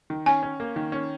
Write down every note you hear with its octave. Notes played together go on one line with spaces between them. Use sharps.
D#3
C#4 G#5
C#4
A#3
D#3
C#4